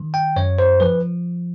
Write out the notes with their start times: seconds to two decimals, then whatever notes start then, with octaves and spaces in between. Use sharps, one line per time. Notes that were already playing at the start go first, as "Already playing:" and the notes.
Already playing: D#3
0.14 G5
0.36 F#2 C#5
0.59 C5
0.80 F3 B4